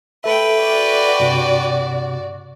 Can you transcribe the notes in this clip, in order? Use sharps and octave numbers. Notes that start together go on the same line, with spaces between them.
A4 B4 E5 G5
F#4 D5
G2 C3